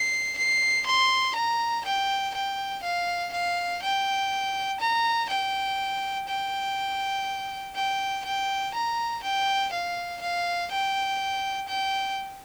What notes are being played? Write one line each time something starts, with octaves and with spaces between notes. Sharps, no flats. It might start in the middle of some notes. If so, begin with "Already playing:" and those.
Already playing: C7
C7
C6
A#5
G5
G5
F5
F5
G5
A#5
G5
G5
G5
G5
A#5
G5
F5
F5
G5
G5